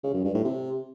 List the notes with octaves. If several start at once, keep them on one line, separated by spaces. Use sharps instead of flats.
C#3
F#2
G2
A2
C3